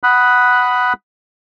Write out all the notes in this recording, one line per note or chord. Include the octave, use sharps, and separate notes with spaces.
F#5 B5 D#6 F#6